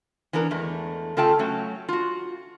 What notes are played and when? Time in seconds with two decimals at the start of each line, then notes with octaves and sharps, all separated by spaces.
0.33 E3 B3 D4 A#4
0.51 E2 G#3 A3
1.17 C#3 A3 F4 A4 G5 A5
1.39 F#3 A3 C#4
1.89 F4 F#4